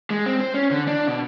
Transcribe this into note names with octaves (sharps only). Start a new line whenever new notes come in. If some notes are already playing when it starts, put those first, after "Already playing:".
G#3
C4
C5
C#4
D3
D4
B2